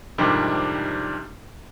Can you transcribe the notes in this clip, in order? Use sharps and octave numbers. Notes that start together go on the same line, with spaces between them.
F2 G#2 C3 D#3 G3 D4